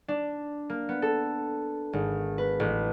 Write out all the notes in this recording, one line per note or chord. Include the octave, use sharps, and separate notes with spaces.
D4
A#3
B3
A4
G#1
B4
A1